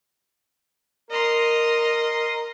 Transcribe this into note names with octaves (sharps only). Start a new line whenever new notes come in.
A#4 D#5 C6